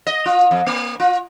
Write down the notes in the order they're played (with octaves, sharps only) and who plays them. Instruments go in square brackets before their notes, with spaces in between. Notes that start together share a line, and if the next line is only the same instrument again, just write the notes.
[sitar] D#5
F4
F2
A#3
F4